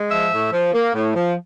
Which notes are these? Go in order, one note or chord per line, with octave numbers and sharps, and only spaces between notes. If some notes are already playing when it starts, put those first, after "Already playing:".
Already playing: G#3
F3 E5
A2
F3
A#3
A2
F3